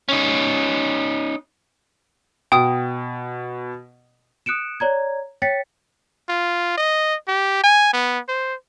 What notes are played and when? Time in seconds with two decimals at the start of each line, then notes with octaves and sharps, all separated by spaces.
0.09 C#4 D#4
2.52 B2 G5 D#6
4.46 D#6 F#6 C#7 D7 E7
4.80 C#5 D5 A#5 G#6
5.42 C#5 G5 A6 B6 C#7
6.29 F4
6.77 D#5
7.28 G4
7.63 G#5
7.93 B3
8.29 C5